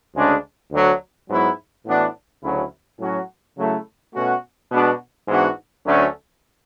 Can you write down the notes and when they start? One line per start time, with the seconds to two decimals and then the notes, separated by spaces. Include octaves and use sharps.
0.14 D2 C#3 G#3 D4
0.71 D2 D3 F#3
1.29 G#2 F#3 B3 E4
1.86 A2 E3 B3 D4 F#4
2.42 D2 C#3 F#3 C#4 E4
2.99 A2 F#3 C#4 F#4
3.57 C#3 F#3 A3 E4
4.14 B2 A3 C#4 F#4
4.71 B2 G#3 B3 D4 F#4
5.28 G#2 E3 B3 D4 F#4
5.85 D2 D3 F#3 A3 C#4